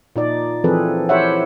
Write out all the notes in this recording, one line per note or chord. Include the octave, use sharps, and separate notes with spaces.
A#2 D#4 D5
E3 F3 C4 G#4 A4 B4
E4 G4 C5 C#5 E5 F#5